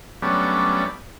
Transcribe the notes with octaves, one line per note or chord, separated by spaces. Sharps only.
F#3 G3 A3 B3 C#4 D4